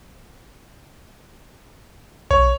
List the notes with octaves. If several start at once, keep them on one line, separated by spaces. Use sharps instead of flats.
B1 C#5